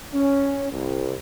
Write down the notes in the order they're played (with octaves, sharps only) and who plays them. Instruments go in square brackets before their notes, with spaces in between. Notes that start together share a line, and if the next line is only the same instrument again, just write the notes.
[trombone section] C#4
C2